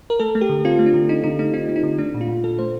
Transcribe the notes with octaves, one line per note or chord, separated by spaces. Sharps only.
A#4
A3 A4
A3
G4
D3
C4 F4
A3
D4
D3
C4 D#4
D3 D#4
A3 D#4
C4 D#4
C4
D#4
D3
A3 D4
A#2
F4
A#2
A3 A4
A3 C5